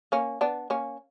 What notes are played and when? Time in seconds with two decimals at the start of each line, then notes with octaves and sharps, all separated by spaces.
0.12 A#3 C#4
0.41 B3 D4
0.70 A#3 C#4